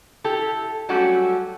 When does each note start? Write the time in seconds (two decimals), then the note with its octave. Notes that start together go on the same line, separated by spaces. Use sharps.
0.24 E4 G4 A4
0.89 F#3 G3 A3 C#4 F#4 G4